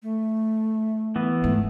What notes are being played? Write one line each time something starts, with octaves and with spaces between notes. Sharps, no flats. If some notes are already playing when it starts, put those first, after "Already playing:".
A3
E3 B3
G#2 A3